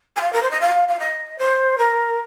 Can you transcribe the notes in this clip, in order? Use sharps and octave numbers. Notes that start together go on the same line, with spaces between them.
G#5
F5
A#4
C5
D#5
F5
F5
D#5
C5
A#4